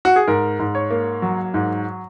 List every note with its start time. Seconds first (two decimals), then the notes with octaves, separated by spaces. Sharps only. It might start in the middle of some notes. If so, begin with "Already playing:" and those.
0.05 F#4
0.16 G#4
0.28 G#2 A#4
0.59 G#2
0.75 C#5
0.90 A#3
1.22 F#3
1.54 G#2